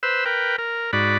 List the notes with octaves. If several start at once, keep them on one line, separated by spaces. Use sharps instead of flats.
B4 C5 E6
A#4 B4 G5
A#4
G#2 F#4 D5 B5